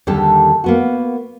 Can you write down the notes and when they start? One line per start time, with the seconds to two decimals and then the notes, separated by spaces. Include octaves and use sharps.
0.07 D#2 D3 G3 G4 A4
0.64 A#3 B3 F#4